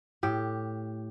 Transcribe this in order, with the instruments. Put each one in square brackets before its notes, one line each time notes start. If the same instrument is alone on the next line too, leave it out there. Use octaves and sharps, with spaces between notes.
[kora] A2 G4